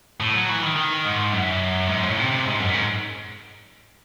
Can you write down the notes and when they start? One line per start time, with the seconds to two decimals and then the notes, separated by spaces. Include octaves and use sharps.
0.20 A2
0.34 F#3
0.49 E3
0.62 D#3
0.76 D#3
1.05 G#2
1.33 F#2
1.89 G#2
2.03 A2
2.17 C3
2.32 C3
2.45 G#2
2.60 F#2
2.74 G#2